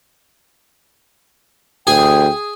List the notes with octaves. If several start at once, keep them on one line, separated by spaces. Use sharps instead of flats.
D2 G#4 G5